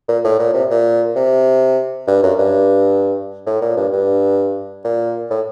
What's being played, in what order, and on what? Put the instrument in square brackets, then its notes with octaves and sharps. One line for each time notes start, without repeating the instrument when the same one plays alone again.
[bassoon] A#2
A2
A#2
C3
A#2
C3
G2
F#2
G2
A2
A#2
G2
G2
A#2
A2